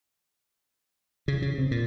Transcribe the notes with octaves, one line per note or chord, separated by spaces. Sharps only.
C#3
C#3
C3
A#2